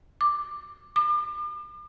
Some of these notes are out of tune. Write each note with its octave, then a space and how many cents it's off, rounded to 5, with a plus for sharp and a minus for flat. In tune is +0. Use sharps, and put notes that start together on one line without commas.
D6 +5
D6 +40